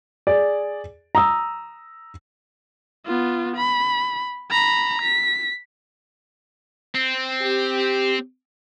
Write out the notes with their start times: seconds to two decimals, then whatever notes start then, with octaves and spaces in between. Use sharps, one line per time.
0.27 G#4 D5
1.15 A#5 D#6 E6
3.06 B3 F4
3.57 B5
4.51 A#5 B5
5.02 B6
6.95 C4
7.41 G4